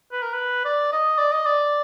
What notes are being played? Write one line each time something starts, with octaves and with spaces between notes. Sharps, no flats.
B4
A#4
B4
D5
D#5
D5
D#5
D5